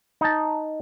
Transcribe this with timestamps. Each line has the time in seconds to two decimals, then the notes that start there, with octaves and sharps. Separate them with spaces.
0.21 D#4 A5